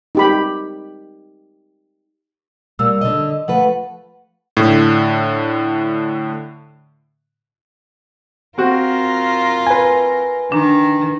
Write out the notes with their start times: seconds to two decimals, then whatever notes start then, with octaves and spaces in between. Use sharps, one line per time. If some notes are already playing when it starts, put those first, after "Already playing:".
0.15 D#4 G4 B5
2.79 A#2 G3 A#3 E6
3.01 D3 D#5
3.48 F3 A3 B4 F#5
4.57 A2 D3
8.58 C4 F4 F#4 A#4
9.67 B4 G#5
10.52 D#3 D4 A#5